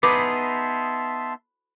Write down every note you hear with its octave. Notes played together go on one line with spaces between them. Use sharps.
B3 D#4 G#4 B4 E5 A5 C6 D6